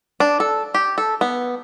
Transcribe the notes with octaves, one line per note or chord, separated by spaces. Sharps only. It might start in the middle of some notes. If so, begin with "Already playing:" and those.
D4
A4
G4
A4
B3